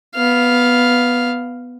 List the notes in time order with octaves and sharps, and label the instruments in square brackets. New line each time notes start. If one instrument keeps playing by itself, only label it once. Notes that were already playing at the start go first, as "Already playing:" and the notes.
[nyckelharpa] B3 F5